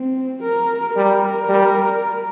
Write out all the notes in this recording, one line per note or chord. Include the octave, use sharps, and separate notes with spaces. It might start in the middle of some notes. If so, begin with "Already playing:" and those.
Already playing: C4
A#4
G3 A#4
G3